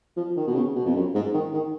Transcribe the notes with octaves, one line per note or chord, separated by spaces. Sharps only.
F3
D#3
B2
C#3
B2
F2
F#2
G#2
D#3
D#3